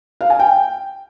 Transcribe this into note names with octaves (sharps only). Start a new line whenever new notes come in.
F5
G#5
G5